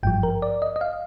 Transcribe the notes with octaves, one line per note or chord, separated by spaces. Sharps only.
G#1 G2 F3 G5
A#4
D5
D#5
D#5
F5